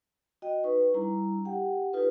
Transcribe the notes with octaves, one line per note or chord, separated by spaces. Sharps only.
F#4 D#5 G5
D#4 B4 C#6
G3 D4 E4 A#5
G4 F#5 G5
D#4 F4 G4 A4 B4